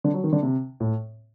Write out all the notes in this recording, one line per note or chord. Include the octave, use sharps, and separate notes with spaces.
D3
F#3
D#3
D3
C3
A2